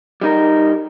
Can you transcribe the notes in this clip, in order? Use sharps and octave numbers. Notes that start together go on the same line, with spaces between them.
G3 D#4 A#4